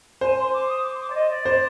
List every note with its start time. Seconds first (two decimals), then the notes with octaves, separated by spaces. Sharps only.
0.21 C5 G#5
0.37 C6
0.53 D6
0.68 D#6
0.84 D6
0.94 C6
0.99 D6
1.10 D5
1.14 D#5
1.29 D5
1.45 C5